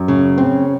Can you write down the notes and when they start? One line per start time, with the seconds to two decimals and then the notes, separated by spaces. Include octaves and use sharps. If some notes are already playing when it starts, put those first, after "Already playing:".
Already playing: F#2
0.08 C#3
0.38 C4